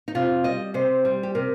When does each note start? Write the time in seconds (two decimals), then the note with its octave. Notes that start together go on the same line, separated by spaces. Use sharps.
0.08 D#4
0.15 C3 F4
0.44 G3 D#5
0.74 C3 C5
1.05 G3
1.23 G4
1.35 C3 A#4